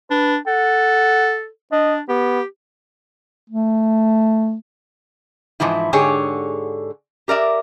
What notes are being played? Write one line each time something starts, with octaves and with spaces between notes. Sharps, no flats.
D4 B4
A4 F#5
D4 D#5
B3 G4
A3
G#2 E3 F3 E4
G#2 D3 G4 G#4 C#5
G4 A#4 D5 E5